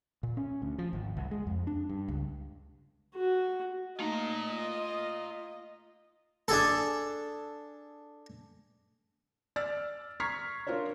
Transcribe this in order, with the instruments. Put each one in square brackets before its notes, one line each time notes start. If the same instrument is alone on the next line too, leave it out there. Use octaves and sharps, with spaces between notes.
[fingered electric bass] A#2
C#4
D2
F3
G#1
C2
G#3
F2
D4
G2
C#2
[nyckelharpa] F#4
[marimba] A3 A#3 D#4 [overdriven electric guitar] F4 A#5 [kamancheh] D#5
[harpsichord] D4 G#4 A4
[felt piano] D5 E6 F6 A6
A#5 C#6 F6 G#6 B6 C7
D4 F4 A#4 C5 C#5